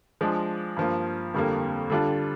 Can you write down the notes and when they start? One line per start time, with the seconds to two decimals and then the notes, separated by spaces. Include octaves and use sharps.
0.21 F3 G#3 D4
0.77 G2 F3 A#3
1.34 F2 D3 G3 A#3
1.90 D3 G3 D4 F4